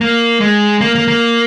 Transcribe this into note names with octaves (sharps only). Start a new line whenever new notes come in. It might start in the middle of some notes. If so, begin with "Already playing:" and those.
A#3
G#3
A#3
A#3
A#3